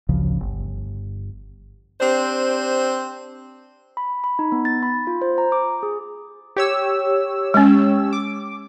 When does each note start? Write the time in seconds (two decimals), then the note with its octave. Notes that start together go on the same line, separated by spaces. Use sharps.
0.09 A1 D2 C#3 F3
0.40 G1
2.01 C4 D4 G4 C5
3.97 B5
4.24 B5
4.39 D#4
4.52 B3
4.65 A6
4.83 B5
5.07 F4
5.22 C5
5.38 A#5
5.52 D6
5.83 G#4
6.56 G4 C#5 E6
7.54 G#3 C#4
8.13 D6